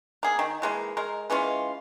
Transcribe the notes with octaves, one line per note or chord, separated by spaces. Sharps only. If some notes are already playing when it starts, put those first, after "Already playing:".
A#3 G#4
D#3
E3 G#3 A#3
G#3 A#4
E3 G#3 C#4 F4